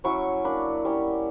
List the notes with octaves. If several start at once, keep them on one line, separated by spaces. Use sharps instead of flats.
F#3 C#4 E4 C#6
A#3 D4 B5
G3 C#4 E4